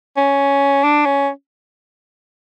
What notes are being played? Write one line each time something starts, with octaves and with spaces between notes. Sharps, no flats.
C#4
D4
C#4